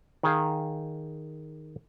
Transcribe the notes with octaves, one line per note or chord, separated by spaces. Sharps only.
D#3 G#4 F5